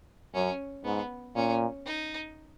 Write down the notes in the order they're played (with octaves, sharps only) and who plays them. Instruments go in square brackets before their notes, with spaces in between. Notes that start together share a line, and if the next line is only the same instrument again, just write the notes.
[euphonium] F#2 [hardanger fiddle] C#4
[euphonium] G#2 [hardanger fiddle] B3
[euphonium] A#2 [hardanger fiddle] C#4
[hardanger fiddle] D#4